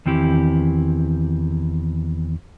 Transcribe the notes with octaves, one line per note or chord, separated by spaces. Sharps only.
E2 D#3 C4 E4 G4